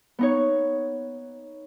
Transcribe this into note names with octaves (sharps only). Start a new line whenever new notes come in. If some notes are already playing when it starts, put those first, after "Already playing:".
B3 D#4 C#5